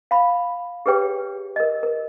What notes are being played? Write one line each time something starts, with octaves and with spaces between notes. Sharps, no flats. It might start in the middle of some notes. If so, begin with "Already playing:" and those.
F5 B5
G4 G#4 B4 C#5 G5
A#4 D#5
A#4